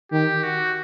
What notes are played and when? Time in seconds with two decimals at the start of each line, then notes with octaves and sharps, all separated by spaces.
0.12 D#3 G4
0.43 F#4